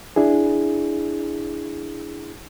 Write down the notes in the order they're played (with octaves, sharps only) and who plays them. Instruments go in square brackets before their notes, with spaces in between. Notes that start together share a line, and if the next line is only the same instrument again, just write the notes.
[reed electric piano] D4 E4 G#4